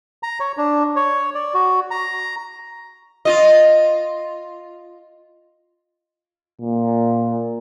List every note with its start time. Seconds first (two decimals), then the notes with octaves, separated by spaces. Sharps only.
0.23 A#5
0.40 C#5
0.57 D4
0.96 C#5
1.35 D5
1.54 F#4
1.91 A#5
3.25 F4 D#5
6.61 A#2